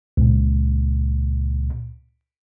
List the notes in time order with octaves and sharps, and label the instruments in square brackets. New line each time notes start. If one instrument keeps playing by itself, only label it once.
[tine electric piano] C#2 A#2